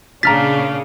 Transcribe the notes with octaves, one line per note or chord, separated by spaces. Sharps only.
A#2 C#3 D4 F5 A#5 F6 A6 B6